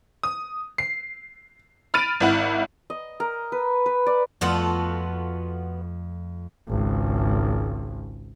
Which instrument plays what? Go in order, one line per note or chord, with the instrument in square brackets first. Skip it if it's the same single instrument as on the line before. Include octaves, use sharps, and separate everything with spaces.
[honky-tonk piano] D#6
C7
B5 F6 A6 D7 D#7
G#1 E4 F#5
[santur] D#5
A#4
B4
B4
D5
[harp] F2 A3 E6 [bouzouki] B3 F4 F#4
[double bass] G#1 C#2